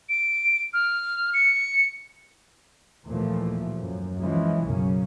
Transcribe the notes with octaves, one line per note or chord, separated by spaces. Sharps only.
D7
F6
C#7
D#2 A#2 E3 F3 A3
F#2
E3 F3 G#3 C#4
B1 F#2 C#3 A#3 C#4